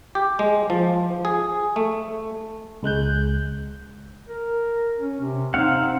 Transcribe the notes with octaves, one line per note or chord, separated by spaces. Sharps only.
G4
G#3
F3
G#4
A3
C#2 G#3 F#6 G6
A#4
C#4
C3
C4 D#4 F5 F#5